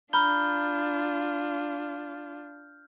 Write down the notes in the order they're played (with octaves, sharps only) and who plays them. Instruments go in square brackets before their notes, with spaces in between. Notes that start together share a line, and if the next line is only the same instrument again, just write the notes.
[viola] D4 F4 [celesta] A#5 B5 G7 [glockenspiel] F6 G6